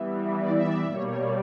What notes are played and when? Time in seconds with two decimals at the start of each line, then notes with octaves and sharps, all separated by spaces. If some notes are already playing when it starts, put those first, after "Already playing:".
Already playing: E3 G3 B3 E5
0.40 D5
0.60 E5
0.67 D5
0.94 B2 G3 A#3 C#5
1.06 C#5
1.20 D5